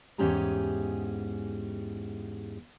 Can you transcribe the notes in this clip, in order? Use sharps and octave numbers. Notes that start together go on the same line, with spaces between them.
E2 G#2 C#4 G4 G#4 A#5